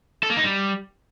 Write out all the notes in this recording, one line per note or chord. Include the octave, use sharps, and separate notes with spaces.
A4
A#3
D#4
G3